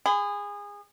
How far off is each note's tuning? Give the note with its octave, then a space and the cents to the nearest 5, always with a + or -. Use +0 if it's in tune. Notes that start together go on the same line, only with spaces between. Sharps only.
G#4 -25 B5 +40